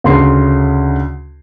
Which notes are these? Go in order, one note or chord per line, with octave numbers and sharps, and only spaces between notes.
D2 C#3 C6 C7